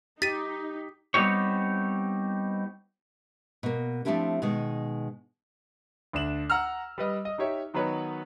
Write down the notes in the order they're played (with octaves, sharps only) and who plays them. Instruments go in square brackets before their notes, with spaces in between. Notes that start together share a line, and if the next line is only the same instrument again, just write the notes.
[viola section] D#4 [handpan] G4 [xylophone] A6 D#7 [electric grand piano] B6
[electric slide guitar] G3 B3 C4 D#4 G4 C#5
[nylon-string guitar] B2 A#3
F3 A3 C4 D4 E4 G4
B2 D#3 G#3
[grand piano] D2 D4 E7 F#7
F#5 A#5 E6 F6
G3 B4 D#5
D#5
D#4 G4 C#5 E5
D#3 F#3 B3 D#4 B4 C#5